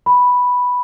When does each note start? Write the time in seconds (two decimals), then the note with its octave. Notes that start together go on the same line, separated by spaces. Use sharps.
0.06 B5